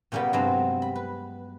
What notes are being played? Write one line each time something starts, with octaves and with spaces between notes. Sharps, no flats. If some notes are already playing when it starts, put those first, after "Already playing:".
A#2 C#3 G3 A#3 B3
G2 C3 F#3 G#3 B3 C4
B5
B4